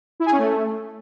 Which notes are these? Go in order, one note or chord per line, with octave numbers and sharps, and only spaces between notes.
E4
G#4
C#4
A3